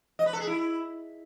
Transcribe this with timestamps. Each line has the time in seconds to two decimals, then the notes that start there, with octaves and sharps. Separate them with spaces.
0.19 D#5
0.26 B4
0.33 A4
0.40 G#4
0.47 E4